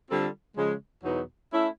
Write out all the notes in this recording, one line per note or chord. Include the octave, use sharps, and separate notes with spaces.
D3 G3 C4 F4 A4
C#3 F3 G#3
E2 B2 F#3 B3 D#4
A3 C#4 E4